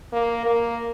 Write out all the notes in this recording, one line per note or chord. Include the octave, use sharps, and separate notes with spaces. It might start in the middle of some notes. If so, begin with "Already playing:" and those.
A#3
A#3